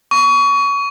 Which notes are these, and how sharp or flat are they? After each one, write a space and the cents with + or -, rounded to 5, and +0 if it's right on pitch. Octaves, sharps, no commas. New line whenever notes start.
C#6 +25